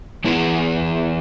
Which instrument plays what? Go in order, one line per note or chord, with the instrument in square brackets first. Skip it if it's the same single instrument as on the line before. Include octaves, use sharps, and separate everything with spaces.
[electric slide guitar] E3 B3 E4 G#4 B4